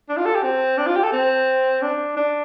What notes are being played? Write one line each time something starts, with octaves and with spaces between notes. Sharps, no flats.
D4
F4
A4
G4
C4
D4
F4
G4
A4
C4
D4
D4